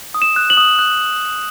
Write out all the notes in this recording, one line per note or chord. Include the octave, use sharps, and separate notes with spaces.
D#6
E7
F#6
F#7
D#6
F#6